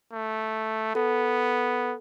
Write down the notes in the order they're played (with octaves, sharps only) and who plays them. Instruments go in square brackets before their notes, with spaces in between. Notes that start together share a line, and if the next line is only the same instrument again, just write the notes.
[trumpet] A3
[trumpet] B3 [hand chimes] A4